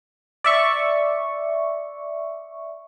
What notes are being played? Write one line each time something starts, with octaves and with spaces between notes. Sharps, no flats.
D5 E5 C#6